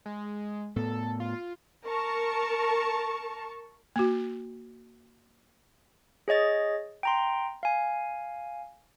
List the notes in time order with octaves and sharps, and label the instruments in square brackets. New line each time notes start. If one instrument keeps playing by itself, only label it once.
[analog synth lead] G#3
[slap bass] A2 B3 [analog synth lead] A4
[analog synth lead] F4
[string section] A#4 A5 C#6
[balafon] A#3 F#4
[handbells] G#4 C#5 D#5 A6
G5 A#5 C6
F5 G#5